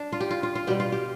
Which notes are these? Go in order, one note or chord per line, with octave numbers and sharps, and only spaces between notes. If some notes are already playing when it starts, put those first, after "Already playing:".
Already playing: D4
F4
G4
F4
F4
F4
B2 G3 G4
F4
G4